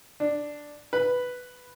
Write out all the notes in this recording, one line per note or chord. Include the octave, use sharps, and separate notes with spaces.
D4
B4